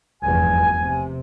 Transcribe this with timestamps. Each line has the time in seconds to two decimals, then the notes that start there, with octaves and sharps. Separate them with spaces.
0.23 F1 E2 G2 G#5
0.83 C3